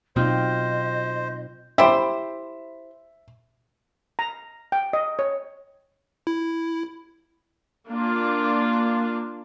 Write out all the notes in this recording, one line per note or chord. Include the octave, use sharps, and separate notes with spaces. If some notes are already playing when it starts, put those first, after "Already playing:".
B2 F#3 C4 D#4 F4 C5 D#5
E4 G4 C5 E5
A#5
G5
D#5
C#5
E4
A#3 D4 F4